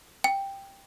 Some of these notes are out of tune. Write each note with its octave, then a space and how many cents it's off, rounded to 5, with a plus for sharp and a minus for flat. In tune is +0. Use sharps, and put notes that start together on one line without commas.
G5 +5